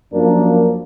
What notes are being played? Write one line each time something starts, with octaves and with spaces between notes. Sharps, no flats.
F#2 F3 A#3 D4 A#4